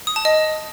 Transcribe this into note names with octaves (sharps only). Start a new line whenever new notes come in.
D#6
A5
D#5